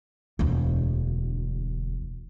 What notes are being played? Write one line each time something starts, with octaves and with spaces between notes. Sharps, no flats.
E1 D2